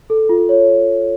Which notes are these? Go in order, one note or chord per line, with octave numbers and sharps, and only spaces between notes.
A4
F4
C#5